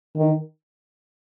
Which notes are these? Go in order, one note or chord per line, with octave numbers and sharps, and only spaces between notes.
D#3